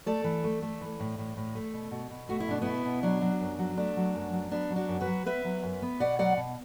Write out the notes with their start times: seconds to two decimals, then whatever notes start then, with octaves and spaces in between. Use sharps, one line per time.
0.06 A3 A4 D5
0.24 E3
0.44 A3
0.62 A3
0.81 E3
1.00 A2
1.18 A2
1.37 A2
1.55 A3
1.74 B2
1.91 B2
2.10 B2
2.29 A3 F#4
2.40 E4
2.48 B2 D4
2.62 B2 B3 E4
2.85 B2
3.03 F#3 D4
3.21 F#3
3.40 F#2
3.59 F#3
3.77 A3 D4
3.97 F#3
4.15 F#2
4.33 F#3
4.51 B3 D4
4.70 F#3
4.76 D4 F#4
4.88 F#2
5.01 F#4 B4
5.07 F#3
5.26 B3 B4 E5
5.45 F#3
5.63 F#2
5.82 B3
6.00 B2 D5 F#5
6.19 F#3 D5 F#5
6.37 B2